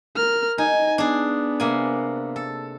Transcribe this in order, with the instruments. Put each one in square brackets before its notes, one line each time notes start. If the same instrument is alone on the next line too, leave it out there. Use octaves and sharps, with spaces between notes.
[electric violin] A#4 F6
[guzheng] D#4 [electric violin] G#5
[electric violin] B3 [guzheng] D4 G#4
[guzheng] C3 A#3 G#5
A4